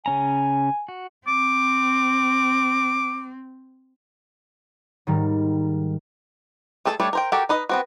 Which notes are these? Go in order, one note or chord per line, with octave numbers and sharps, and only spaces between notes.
C#3 C#4 G#5 A#5
F#4
C4 D6
G#2 D#3 G3 A#4
A3 G#4 A4 B4 A5
G3 A3 D4 A4 C#5
A#4 C5 G5
F#4 G4 A4 A#4 G5
D#4 B4 D#5
B3 C4 F#4